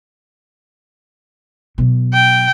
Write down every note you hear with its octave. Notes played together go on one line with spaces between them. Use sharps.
B2 F#3
G5